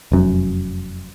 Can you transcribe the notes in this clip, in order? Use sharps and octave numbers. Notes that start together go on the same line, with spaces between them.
F1 F#2